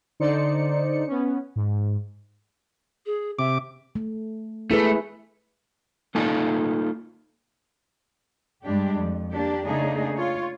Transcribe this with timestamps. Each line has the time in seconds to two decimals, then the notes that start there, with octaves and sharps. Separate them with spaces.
0.20 D3 D#4 C5 D5 C#7
1.08 B3 C#4
1.56 G#2
3.06 G#4
3.39 C3 E5 D6
3.96 A3
4.71 A3 E4 G#4 B4
6.15 A#3 D#4 F4 A4 F5 G#5
8.65 G2 G3 G#3 D4 G4
8.99 F2
9.32 A#3 D4 G4
9.66 C#3 A3 A#3 D4 D#4 G#4
10.15 F4 C#5